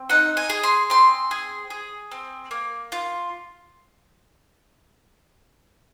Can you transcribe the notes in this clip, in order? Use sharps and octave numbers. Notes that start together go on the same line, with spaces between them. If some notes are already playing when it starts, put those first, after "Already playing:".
Already playing: C4
D#4 F#5
G#5
G#4
C6
C4 C6
G#4
G#4
C4
A#3
F4